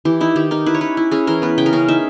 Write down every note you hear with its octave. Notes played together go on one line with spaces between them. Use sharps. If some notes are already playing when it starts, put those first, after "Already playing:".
E3 G4
D#4 E4
D#3 G4
D#4 A#4
E4 B4
C#5
C#4 B4
E4
C#4 G#4
E3 A#4
B3 B4
C#3 G5
A#4
C#4 G#4
D#4 E5